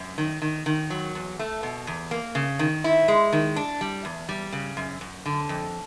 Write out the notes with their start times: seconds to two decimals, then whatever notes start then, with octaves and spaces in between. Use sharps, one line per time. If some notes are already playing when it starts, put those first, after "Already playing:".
Already playing: F#2
0.18 D#3
0.42 D#3
0.66 D#3
0.90 F#3
1.15 E2
1.39 A3
1.63 B2
1.87 E2
2.11 A#3
2.35 C#3
2.59 D#3
2.84 E4
3.08 G#3
3.33 D#3
3.56 D4
3.81 G3
4.05 E2
4.29 G3
4.52 C#3
4.77 F#2
5.01 F#2
5.26 D3
5.49 F2